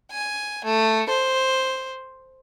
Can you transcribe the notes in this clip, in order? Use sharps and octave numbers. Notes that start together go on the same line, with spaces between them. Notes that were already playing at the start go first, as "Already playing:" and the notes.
G#5
A3
C5